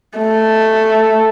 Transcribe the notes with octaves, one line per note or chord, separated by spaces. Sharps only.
A3